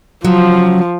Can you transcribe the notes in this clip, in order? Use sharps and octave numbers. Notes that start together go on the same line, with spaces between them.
C#3 F3 F#3